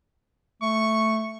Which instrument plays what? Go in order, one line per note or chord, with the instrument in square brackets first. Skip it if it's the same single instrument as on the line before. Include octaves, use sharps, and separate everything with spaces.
[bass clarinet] A3 [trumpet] C#6